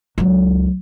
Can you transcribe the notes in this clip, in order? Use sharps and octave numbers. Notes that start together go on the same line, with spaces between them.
C#2 F#3